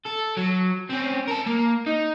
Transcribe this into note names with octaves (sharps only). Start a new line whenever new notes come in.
A4
F#3
C4 C#4
A#4 A5
A#3
D#4